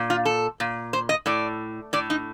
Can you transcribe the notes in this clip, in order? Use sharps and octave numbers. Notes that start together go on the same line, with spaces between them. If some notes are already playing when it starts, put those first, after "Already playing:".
Already playing: A#2
F4
A4
A#2
C5
D#5
A2 D5
A2 D5
D#4